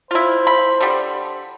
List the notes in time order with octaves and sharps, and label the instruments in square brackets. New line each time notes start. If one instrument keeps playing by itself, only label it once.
[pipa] E4 F4 [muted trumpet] C5
[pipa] B5
D3 G3